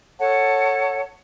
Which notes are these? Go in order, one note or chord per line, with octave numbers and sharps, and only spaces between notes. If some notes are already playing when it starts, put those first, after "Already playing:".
A4 C#5 F#5 A5